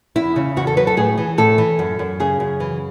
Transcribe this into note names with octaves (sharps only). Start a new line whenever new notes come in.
E2 E4
C#3
E2 F#4
A4
F#3 B4
A4
A2 G#4
E3
A2 A4
E3
F#2
F#2
C#3 G#4
F#2
E3